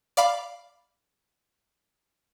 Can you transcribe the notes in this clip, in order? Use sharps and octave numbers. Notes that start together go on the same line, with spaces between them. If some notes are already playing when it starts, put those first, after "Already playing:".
D5 F5 B5 D6